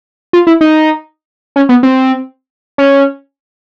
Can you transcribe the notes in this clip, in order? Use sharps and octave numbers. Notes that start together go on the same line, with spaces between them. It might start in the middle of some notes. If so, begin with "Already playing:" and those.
F4
E4
D#4
C#4
B3
C4
C#4